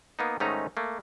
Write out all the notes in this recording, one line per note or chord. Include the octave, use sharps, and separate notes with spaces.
A#3 B3 D#4
G#2 D#3 A3 C#4 D#4 A#5
A3 A#3